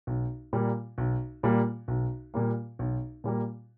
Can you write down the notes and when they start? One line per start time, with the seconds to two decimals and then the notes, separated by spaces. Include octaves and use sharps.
0.07 B1
0.53 A#2 G3 A#3
0.98 B1
1.43 A#2 G3 A#3
1.88 B1
2.34 A#2 G3 A#3
2.79 B1
3.24 A#2 G3 A#3